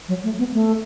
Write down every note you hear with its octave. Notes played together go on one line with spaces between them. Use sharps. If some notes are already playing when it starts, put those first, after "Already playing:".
F#3
A3
B3
A3